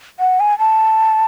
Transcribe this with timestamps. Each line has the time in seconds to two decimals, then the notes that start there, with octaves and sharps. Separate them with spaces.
0.20 F#5
0.40 G#5
0.59 A5